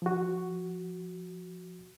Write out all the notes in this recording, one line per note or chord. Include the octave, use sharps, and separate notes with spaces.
F3 F#4